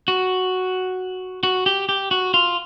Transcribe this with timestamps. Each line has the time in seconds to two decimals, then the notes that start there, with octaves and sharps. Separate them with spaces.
0.08 F#4
1.43 F#4
1.66 G4
1.89 G4
2.11 F#4
2.34 F4